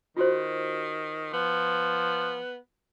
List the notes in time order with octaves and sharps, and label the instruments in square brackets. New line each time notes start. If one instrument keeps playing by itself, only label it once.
[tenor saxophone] D#3 [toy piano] F4 F#4 C5
[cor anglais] F3 [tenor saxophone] B3